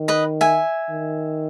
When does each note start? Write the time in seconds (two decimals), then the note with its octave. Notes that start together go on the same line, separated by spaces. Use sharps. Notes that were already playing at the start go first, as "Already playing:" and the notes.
Already playing: D#3
0.08 B4 D#5
0.41 E5 G#5
0.90 D#3